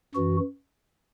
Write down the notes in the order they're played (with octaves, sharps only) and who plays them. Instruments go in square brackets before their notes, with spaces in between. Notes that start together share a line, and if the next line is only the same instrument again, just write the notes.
[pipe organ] F#2 E3 F#4